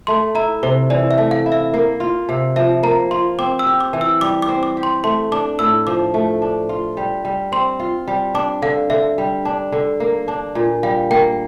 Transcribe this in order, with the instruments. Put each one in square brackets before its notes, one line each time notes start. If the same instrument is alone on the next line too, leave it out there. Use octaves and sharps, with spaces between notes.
[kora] A3 [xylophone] C6
[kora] E4 [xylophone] A#5
[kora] C3 [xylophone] C5
[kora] E3 [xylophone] D5
[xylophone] E5
[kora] A3
[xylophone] F5
[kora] E4
[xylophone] E5
[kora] A#3
F4
C3
[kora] F3 [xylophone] E5
[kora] A#3 [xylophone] A#5
[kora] F4 [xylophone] C6
[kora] C4 [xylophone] D6
[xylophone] E6
[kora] G4
[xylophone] D6
[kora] E3
[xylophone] E6
[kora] G3 [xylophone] D6
[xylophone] D6
[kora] C4
[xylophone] D6
[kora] G4
[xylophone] C6
[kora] A3 [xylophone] C6
[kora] D4 [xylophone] D6
[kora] A2 [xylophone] E6
[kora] F3 [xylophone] D6
[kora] A3
D4
F4
G3
G3
[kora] C4 [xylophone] C6
[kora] F4
G3
[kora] D4 [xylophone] D6
[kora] D3 [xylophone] F5
[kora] D3 [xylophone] E5
[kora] G3
D4
D3
A#3
D4
A#2
[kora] G3 [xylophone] F5
[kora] A#3 [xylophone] G5